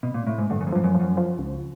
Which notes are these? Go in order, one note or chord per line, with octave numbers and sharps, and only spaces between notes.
B2
A#2
A2
G#2
G2 D3
F#2
F2
G2 F3
F#2
F3
F#2
F3
C#2